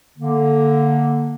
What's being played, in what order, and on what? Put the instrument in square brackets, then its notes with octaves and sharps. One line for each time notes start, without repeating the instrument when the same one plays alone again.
[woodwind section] D3 A#3